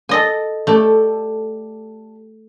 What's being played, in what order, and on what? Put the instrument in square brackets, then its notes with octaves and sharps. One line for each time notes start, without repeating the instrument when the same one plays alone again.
[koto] A4 D#5 G#5
[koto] A3 [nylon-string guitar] G4 A4 D5